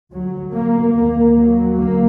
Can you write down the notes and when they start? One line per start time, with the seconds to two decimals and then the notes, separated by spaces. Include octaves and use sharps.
0.13 D2 F#3
0.55 A#3
0.96 D#2 A#3
1.38 F#3
1.78 D2 A#3